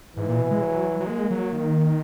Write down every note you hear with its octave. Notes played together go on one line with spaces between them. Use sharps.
G#2 E3
A#2
B2
G#3
F#3
F#3
G#3 A#3
F#3
D#3